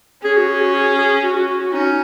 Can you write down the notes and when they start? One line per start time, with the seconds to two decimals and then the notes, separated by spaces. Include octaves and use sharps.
0.24 C#4 G#4
0.37 F#4
0.49 G#4
0.61 F#4
0.74 G#4
0.98 G#4
1.23 F#4
1.36 F#4
1.48 F#4
1.60 F#4
1.73 C#4 D#4